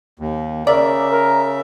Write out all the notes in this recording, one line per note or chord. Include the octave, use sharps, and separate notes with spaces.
D#2
C#3 A#4 D5 E5
A#4